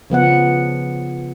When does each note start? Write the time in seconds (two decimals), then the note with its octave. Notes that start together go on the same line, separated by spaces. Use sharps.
0.10 C#3 F3 B3 F#5